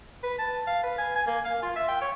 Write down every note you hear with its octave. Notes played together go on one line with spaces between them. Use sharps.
B4
A5
F5
B4
G#5
G#5
A#3
F5
F4
E5
G5
C#5